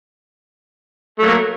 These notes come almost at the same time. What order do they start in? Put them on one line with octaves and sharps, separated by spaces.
A3 F#3 A#3